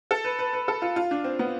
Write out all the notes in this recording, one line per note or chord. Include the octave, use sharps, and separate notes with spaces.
A4
B4
B4
B4
A4
F4
F4
D4
C4
B3